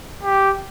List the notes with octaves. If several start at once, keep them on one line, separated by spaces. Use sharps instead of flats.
G4